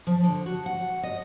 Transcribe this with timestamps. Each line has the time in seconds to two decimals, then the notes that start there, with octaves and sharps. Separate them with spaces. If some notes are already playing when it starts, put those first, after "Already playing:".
0.07 F3
0.24 D3
0.46 F#4
0.66 F#5
1.03 D#5